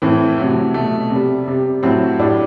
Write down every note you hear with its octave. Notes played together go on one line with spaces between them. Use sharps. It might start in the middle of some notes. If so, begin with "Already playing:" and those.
A2 E3 A3 C4
C3 F#3 A3
B2 A3
C3 G3
C3 G3
A2 F#3 A3 C4
A2 G3 D4